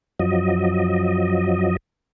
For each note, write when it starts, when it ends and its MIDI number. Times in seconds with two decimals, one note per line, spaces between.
0.20 1.77 42
0.20 1.77 53
0.20 1.77 54
0.20 1.77 75